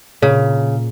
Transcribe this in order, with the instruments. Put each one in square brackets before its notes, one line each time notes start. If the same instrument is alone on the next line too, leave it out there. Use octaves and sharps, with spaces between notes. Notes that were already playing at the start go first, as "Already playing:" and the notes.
[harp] A#2 [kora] C#3